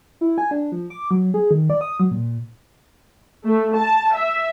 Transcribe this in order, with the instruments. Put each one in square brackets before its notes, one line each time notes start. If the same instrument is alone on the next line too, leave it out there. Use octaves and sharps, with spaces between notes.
[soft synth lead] E4
G#5
D4
F3
D6
F#3
G#4
D#3
D5
D#6
F#3
A#2
[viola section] A3
A5
E5